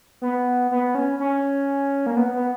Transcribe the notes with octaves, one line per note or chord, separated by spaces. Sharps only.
B3
B3
C#4
C#4
A#3
B3
B3